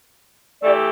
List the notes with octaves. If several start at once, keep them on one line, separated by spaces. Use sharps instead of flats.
E3 A3 G4 D5